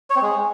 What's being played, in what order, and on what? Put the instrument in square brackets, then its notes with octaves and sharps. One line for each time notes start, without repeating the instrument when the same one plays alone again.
[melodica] C#5
C4
G#3